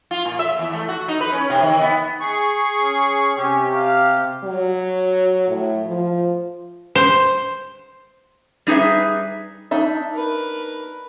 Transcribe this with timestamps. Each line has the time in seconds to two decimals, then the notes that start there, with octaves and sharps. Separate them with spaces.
0.11 F4
0.25 A#2
0.39 E5
0.59 E2
0.73 A3
0.89 F#4
1.08 D#4
1.21 B4
1.33 C#4
1.50 C3
1.62 D#3
1.81 B3
2.20 G#4 C#6
2.81 C#4
3.37 C3 C#4 G4
3.74 F5
4.44 F#3
5.48 A2
5.86 F3
6.95 C5
8.67 G3 D#4 G#4 B4 E5
9.71 D4 D#4 E5
10.13 A#4 B4